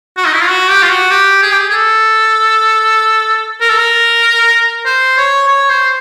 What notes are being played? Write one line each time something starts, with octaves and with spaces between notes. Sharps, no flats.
F#4
D#4
E4
F4
F#4
G4
F4
F#4
G4
G#4
G4
G#4
G#4
A4
A#4
A4
A#4
C5
C#5
C#5
C5